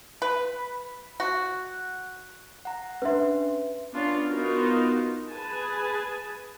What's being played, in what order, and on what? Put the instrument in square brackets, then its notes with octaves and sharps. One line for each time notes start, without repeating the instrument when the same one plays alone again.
[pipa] B4
F#4
[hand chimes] F#5 A#5
[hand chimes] C#4 D4 C6 [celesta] B4 E5
[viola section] B3 C#4 D4 F4
B3 D#4 F4 F#4 A#4
G#4 B4 G#5 A5